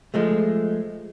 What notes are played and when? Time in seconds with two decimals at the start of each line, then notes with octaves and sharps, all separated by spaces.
0.14 F3 G#3 A3